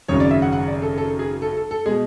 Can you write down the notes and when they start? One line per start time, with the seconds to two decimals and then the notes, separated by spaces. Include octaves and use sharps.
0.08 G#1 F#2 C#3 C#5
0.20 D5
0.31 E5
0.42 F#5
0.53 F#5
0.68 D5
0.82 A4
0.98 A4
1.19 G#4
1.42 A4
1.57 A4
1.71 A4
1.86 B2 G#3 G#4